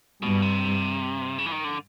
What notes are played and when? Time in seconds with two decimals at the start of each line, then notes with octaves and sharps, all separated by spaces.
0.23 G2 B2
0.42 C3
1.38 C#3
1.46 E3
1.52 D#3
1.64 D3